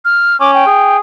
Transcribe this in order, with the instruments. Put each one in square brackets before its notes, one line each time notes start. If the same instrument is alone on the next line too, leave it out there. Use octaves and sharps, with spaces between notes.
[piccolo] F6
[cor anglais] C#4 [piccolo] D6
[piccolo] G5
[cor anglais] G#4